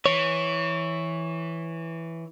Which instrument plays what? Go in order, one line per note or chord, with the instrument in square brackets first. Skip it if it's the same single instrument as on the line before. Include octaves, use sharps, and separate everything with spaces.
[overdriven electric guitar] E3 [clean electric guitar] C#5